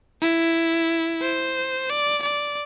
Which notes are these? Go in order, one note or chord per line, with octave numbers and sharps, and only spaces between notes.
E4
C5
D5
D5